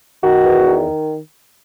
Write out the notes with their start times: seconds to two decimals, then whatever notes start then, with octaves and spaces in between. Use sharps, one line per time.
0.23 D#3 F#4
0.44 E2
0.67 D#3